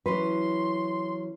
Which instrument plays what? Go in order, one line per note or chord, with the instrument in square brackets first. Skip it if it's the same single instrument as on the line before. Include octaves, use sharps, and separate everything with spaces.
[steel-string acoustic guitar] E3 F#3 C#4 [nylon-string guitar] B4 [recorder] C6